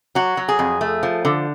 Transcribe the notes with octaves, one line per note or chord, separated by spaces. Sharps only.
F#3 F#4
F#3
G#4
F2
A3
F3
D3